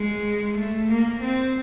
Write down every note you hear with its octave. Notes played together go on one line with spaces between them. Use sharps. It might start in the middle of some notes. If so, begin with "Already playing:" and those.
Already playing: G#3
A3
A#3
C4